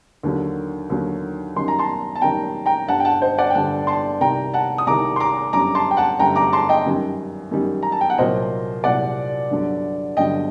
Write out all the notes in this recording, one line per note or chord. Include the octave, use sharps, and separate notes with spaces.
D#2 D3 F#3
D#2 D3 F#3
F#2 D#3 G3 C6
A#5
A5 C6
A5
F#2 D#3 G3 G5 A#5
G5 A#5
G1 G2 D3 F#5 A5
G5
F#5 A5
C5 D#5
D5 F#5
G5
G1 G2 D3 F#5 A5
A5 C6
C2 C3 D#3 G5 A#5
F#5 A5
D#6
C2 C3 D#3 A#5 D6
C6
A#5 D6
G1 F#2 D3 G3 A#5 D6
A5 C6
G5
F#5 A5
G1 F#2 D3 G3 G5 A#5
A#5 D6
A5 C6
D#5 G5
F#2 D#3 G3
F#2 D#3 G3
A#5
A5
G5
F#5
C2 A#2 F#3 C5 D#5
C2 A#2 F#3 D5 F#5
G1 G2 D3 F#3
G1 G2 D3 F#3 D#5 G5